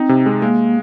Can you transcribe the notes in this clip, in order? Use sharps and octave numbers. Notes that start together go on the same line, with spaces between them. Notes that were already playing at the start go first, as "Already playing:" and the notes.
Already playing: C4 D#4
C3
G#3
G#3 A#3